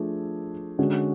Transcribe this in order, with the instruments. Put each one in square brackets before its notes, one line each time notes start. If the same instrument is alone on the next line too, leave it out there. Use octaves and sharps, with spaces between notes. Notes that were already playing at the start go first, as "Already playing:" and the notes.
Already playing: [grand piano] F3 A3 D4 G#4
D3 G#3 C#4 F#4